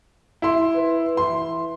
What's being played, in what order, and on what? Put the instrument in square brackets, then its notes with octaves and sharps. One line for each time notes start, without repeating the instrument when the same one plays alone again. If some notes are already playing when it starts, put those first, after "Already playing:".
[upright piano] E4 C6
[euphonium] B4
[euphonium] E3 [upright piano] C6